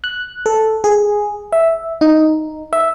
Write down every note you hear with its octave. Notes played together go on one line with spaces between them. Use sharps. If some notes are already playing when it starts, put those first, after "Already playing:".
F#6
A4
G#4
E5
D#4
E5